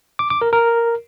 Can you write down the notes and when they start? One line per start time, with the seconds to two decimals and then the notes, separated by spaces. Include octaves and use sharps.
0.19 D6
0.30 D6
0.42 A#4
0.53 A#4